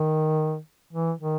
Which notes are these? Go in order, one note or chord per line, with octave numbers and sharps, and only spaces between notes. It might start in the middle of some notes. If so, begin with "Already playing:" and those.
Already playing: D#3
E3
D#3